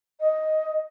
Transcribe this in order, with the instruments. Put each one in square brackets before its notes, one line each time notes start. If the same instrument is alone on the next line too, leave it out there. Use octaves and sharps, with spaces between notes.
[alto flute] D#5